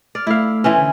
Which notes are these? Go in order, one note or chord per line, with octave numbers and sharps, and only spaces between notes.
D5 F6
A3 E4 F5
E3 C4 C#4
D3